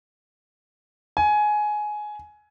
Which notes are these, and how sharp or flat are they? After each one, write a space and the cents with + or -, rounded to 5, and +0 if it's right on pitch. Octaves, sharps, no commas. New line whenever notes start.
G#5 +15